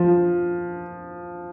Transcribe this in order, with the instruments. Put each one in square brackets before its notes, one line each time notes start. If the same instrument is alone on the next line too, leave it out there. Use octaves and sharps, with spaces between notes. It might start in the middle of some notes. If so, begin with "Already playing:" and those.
Already playing: [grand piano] F3